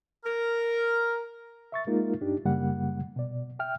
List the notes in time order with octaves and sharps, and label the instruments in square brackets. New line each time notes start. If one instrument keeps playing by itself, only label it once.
[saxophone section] A#4
[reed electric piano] E5 C#6 A6
G#3 A#3 D#4 F4 A#4
G2 D4 D#4 G4
F#2 C#3 G3 A#3 G4 F#5
B2 D5
E5 G5 F6